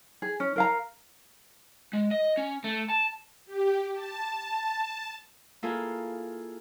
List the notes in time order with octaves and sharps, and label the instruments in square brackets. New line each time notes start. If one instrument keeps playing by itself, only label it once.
[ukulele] G#4
C#4
A#4 F5 A#5
[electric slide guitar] G#3
D#5
C#4
A3
A5
[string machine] G4
A5
[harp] A#3 E4 F4 G#4 A4